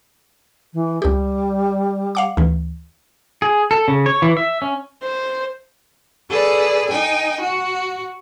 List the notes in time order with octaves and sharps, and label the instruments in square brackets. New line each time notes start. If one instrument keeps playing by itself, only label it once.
[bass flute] E3
[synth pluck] C#2 G4 [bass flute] G3
[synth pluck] F5 F#5 D6
D2 E3
[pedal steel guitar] G#4
A4
C#3
C#5
E3
E5
C#4
[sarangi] C5
[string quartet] G#4 A4 B4 D5
D#4 G5 G#5
F#4